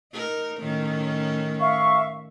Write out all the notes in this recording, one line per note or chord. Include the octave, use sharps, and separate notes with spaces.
D#4 A#4
A2 D#3 C#4
E5 F5 C#6